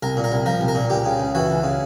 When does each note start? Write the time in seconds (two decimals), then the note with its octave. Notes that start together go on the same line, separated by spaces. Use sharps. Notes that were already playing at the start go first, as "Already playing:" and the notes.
0.03 C2 A#4
0.17 A#2
0.24 A#4
0.32 C2
0.46 F3 A#4
0.61 C2
0.68 A#4
0.75 A#2
0.90 C#2 G4
1.06 C#3
1.20 C#2
1.35 E3 F#4
1.50 C#2
1.63 C#3